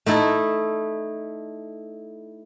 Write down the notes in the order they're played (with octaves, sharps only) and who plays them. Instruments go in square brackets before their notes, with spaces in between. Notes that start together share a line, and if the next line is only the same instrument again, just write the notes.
[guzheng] A3 D#4 E4 A4